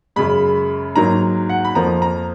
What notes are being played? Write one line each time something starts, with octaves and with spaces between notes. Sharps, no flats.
F#2 C#3 G#3 B5
G#2 F#3 A#3 A#5
F#5
B5
F2 F3 A#3 A#5
A#5